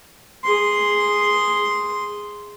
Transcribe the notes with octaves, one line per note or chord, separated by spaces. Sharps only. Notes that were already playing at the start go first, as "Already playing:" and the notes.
G#4 C6